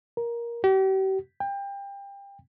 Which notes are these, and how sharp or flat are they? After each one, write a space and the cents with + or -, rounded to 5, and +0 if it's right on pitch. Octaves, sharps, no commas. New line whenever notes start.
A#4 +15
G4 -40
G5 +25